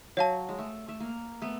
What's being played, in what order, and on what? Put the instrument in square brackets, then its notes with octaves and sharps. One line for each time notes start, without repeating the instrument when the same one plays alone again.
[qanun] F#3 [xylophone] C#5 F5 A5
[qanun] G#3
A3
A3
A#3
A3 B3